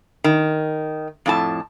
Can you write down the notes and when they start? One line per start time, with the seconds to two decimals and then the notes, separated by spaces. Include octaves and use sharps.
0.24 D#3
1.26 F2 A2 A5